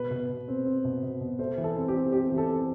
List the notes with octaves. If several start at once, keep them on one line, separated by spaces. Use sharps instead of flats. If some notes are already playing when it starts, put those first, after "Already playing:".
Already playing: B2 B4
B2
B2
C4
C4
B2
B2
B2
A3 C5
E3
A4
C4
G4
C4
C4 G4
E3
A4
C4